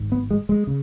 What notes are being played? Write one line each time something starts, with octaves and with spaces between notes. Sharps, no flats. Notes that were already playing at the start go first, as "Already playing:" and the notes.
Already playing: G#1 G#2
B3
G#3
G#3
C#3